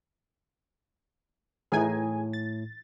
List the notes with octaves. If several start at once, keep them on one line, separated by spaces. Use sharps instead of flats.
A2 E3 D#4 G#4 G#5
A6